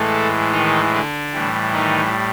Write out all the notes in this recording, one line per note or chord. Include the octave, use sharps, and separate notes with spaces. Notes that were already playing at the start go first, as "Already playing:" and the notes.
Already playing: A2 E3 G#3 A3 A4
D#3 D#4
D3 D4
A2 E3 G3
D#3 D#4